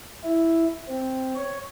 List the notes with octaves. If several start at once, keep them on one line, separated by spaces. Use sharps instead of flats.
E4
C4
C#5